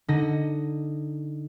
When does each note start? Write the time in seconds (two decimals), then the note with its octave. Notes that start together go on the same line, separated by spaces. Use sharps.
0.08 D3 D#4 A#6